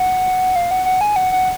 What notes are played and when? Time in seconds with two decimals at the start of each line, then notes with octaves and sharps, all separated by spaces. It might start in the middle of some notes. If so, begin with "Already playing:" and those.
Already playing: F#5
0.56 F5
0.71 F#5
0.85 F#5
1.01 G#5
1.16 F#5
1.32 F#5